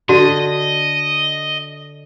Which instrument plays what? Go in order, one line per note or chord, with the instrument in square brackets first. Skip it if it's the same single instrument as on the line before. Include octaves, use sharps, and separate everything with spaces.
[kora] D3 [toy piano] F#4 [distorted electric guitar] D#5